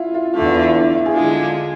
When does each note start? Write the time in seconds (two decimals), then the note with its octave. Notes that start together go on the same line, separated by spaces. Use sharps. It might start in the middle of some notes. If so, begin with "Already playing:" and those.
Already playing: E4 F4
0.14 F4
0.34 E2 D3 A3 F4
0.54 E4
0.74 D4
0.95 E4
1.06 G#4
1.15 D3 G#3 D4 F4